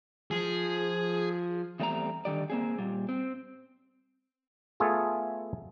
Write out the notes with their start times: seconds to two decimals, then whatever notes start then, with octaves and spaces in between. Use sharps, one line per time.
0.31 F3 G#4
1.80 E2 G3 A3 C4 E4 A#5
2.25 D3 D#3 G3 D5
2.50 A#3 C4 G#4
2.78 A#2 G3
3.09 C4
4.80 A3 B3 F4 G#4 A4